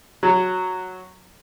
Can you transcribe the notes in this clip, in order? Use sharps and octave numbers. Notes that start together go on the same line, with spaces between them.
F#3